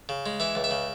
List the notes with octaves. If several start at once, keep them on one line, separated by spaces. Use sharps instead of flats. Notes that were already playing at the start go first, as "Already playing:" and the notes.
C#3
G#3
E3 E5
C#2
E5
C#3